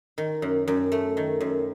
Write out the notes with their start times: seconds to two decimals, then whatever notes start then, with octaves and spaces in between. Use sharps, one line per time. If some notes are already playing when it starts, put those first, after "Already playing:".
0.18 D#3
0.42 F#2
0.68 F#2
0.92 A3
1.17 D#3
1.41 F#2